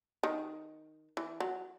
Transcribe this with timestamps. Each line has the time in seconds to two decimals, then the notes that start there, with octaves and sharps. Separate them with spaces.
0.23 D#3
1.17 E3
1.40 F#3